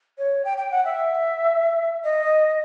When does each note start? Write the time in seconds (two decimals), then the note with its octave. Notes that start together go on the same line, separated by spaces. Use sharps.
0.18 C#5
0.45 G5
0.58 G5
0.71 F#5
0.85 E5
2.04 D#5